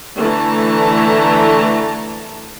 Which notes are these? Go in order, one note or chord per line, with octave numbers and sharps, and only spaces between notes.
D3 E3 A3 A5 A#5